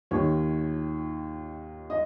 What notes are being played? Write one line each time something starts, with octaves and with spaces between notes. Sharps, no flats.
D#2 D#3 C#5
D#5